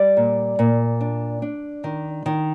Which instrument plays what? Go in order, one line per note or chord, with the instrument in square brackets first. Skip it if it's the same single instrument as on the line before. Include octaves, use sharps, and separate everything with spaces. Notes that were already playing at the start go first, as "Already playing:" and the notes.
Already playing: [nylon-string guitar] G3 D5
A#2
A#2
D4
D4
D#3
D#3